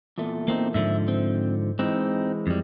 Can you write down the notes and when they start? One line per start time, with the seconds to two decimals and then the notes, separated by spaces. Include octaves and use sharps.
0.18 E2 A#2 A3
0.48 A#3 C4 D#4
0.74 G#2 D3 F3 E5
1.08 C4
1.79 E3 G#3 C4 D#4
2.47 F2 G3